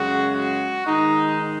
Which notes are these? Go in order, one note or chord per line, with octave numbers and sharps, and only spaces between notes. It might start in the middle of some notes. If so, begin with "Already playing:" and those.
Already playing: F#2 C#3 G#3 F#4
F#4
G#2 D#3 G#3 D#4